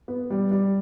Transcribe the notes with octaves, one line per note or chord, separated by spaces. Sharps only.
B3
G3
G3